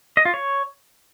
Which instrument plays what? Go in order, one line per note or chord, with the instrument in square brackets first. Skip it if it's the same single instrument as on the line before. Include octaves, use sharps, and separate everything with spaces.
[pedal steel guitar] D#5
F4
C#5